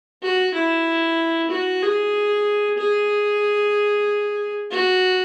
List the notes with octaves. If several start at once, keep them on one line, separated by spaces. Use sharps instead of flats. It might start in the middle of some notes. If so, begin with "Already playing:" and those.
F#4
E4
F#4
G#4
G#4
F#4